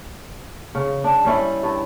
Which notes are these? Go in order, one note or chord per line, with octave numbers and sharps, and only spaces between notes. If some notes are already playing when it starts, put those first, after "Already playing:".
C#3
D4
G3 C#4 E4
G2